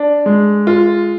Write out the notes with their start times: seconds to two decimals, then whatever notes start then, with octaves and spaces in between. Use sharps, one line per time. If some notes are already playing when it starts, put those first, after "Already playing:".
Already playing: D4
0.26 G#3
0.67 F4